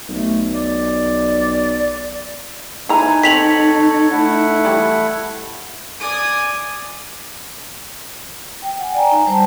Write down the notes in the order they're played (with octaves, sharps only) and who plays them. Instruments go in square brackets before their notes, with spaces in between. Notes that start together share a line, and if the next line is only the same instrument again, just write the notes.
[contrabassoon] B1 [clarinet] A3
[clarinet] D5
[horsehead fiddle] D#4 [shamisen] E4 A#5 [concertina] B4 G#5
[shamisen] C4 [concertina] A4 C#5 [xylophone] B6 F7 F#7
[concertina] A3 E4 F#5
[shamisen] E3 G3
[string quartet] D5 G#5 D#6
[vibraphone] G5
F#5 G#5
D5 G5 G#5 A#5
D#4
G3 C5 A5